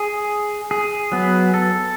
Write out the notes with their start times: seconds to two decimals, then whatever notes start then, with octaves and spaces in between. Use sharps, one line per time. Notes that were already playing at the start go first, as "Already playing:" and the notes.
Already playing: G#4
0.71 G#4
1.12 F#3 B3
1.54 A4